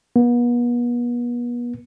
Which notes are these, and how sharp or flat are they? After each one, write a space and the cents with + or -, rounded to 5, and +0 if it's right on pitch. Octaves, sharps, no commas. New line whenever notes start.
B3 -40